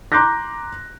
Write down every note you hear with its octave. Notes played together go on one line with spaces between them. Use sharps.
A#5 C6 D6 F#6 G6 A#6